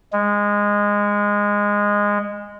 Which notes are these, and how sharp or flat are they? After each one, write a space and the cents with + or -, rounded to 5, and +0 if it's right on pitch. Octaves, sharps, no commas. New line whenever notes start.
G#3 -15